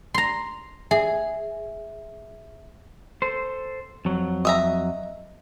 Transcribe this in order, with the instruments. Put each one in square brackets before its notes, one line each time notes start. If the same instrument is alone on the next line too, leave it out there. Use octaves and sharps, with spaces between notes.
[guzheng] A#5 C6
[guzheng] G#4 [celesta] E5
[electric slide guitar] A4 C5
F2 F#3
[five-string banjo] D#5 E5 A#5